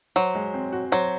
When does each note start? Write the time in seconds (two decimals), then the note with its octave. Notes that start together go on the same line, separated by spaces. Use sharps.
0.16 F#3 C5
0.35 G#3
0.54 C4
0.73 F#4
0.92 F#3 C5